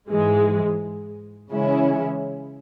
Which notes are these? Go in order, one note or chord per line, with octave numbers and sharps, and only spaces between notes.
G#2 E3 G#3
C#3 E3 G#3 C#4 E4